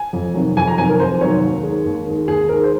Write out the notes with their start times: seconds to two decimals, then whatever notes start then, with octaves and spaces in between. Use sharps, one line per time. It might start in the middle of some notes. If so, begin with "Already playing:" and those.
Already playing: G#5
0.13 F2
0.34 C3 D#3 F#3
0.57 F2 G#5
0.67 A#5
0.78 C3 D#3 F#3 G#5
0.89 A#4
0.99 F2 C5
1.21 C3 D#3 F#3 C#5
1.42 D#2
1.63 D#3 G#3
1.85 D#2
2.07 D#3 G#3
2.28 D#2 G#4
2.49 D#3 G#3 A#4
2.64 C5